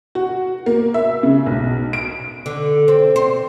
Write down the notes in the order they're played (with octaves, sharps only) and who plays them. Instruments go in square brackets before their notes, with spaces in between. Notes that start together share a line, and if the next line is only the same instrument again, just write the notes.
[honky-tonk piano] F#4
A#3
E5
C#3
B1
D7
[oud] D3
C4
C5